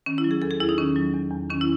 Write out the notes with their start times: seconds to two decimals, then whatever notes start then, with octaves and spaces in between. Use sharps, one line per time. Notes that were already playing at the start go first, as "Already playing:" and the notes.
0.06 D#3 C#4
0.18 E4
0.24 F#3
0.31 G#4
0.42 E2 A4
0.51 G#4
0.60 E2 E4
0.69 D#4
0.78 D#3 C#4
0.96 F#3
1.14 E2
1.31 E2
1.50 D#3 C#4
1.61 E4